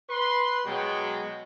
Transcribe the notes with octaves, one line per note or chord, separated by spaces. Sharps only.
B4 C6
B2 F#3 G#3 B3 F#4 G5